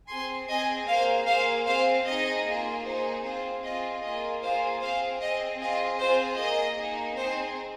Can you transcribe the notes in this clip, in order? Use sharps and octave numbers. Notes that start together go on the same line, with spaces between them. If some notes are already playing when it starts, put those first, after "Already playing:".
C4 G#4 G#5 C6
C4 G#4 D#5 G#5
A#3 G#4 C5 F5
A#3 G#4 C5 F5
C4 G#4 C5 F5
C4 D#4 G#4 D#5
A#3 F4 G#4
A#3 D#4 G#4 C5
C4 F4 G#4 C5
C4 F4 G#4 D#5
A#3 F4 G#4 D#5
A#3 F4 G#4 C5 F5
C4 G#4 C5 F5
C4 G#4 D#5
C4 F4 G#4 D#5
C4 F4 G#4 C5
A#3 G#4 D#5
A#3 D#4 G#4
C4 D#4 G#4 C5